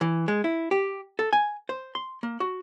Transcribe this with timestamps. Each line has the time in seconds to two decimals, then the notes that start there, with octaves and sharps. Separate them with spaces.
0.01 E3
0.28 G#3
0.44 E4
0.71 G4
1.19 A4
1.33 G#5
1.69 C5
1.95 C6
2.23 A#3
2.40 F#4